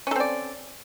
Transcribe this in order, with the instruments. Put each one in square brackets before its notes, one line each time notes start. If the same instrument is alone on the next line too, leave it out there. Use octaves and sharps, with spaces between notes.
[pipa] C#4
A4
C4
D5